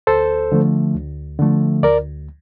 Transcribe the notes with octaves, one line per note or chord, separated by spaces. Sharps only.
D2 A4 C5
D3 F3 A3
D2
D3 F3 A3
D2 A#4 D5